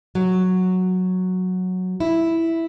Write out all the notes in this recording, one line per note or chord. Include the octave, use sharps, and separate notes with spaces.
F#3
E4